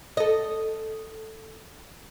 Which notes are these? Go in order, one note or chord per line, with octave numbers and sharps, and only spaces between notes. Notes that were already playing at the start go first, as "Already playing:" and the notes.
A4 D#5